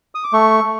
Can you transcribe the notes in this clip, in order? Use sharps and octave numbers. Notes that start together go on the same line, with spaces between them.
D#6
D6
A3 C#6
A3